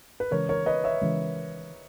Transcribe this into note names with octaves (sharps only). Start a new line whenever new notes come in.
B4
C#3 E3 G#3 C#4 A#4 C#5
A#4 C#5
B4 D#5
C#5 E5
C#3 E3 G#3 C#4